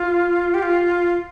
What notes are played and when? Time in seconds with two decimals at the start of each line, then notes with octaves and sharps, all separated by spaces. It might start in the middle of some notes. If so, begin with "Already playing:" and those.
Already playing: F4
0.54 G4
0.63 F4